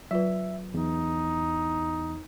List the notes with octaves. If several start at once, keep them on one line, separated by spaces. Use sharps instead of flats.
F#3 F4 B4 E5
E2 D#4